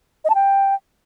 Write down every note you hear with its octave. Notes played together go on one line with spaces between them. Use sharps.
D#5
A5
G5